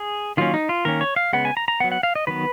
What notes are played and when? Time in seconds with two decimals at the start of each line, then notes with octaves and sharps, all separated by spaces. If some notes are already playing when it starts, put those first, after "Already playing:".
Already playing: G#4
0.37 D#3 F#3 A#3 C#4 F4
0.54 D#4
0.69 F4
0.85 D#3 A#3 C#4 A#4
1.01 C#5
1.16 F5
1.33 C#3 G#3 B3 F#5
1.45 G#5
1.57 A#5
1.68 A#5
1.80 F#3 B3 F#5
1.92 F#5
2.03 F5
2.15 D#5
2.27 D#3 F#3 B3 B4